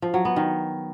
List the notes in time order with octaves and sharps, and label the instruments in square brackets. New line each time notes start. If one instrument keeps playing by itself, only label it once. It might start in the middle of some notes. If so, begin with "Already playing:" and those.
[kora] F3
F#3
B3
D#3